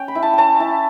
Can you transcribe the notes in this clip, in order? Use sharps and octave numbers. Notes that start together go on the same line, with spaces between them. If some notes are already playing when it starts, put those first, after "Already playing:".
Already playing: C#4 G5
B5
E4
A5
C#4 G5 A5
E4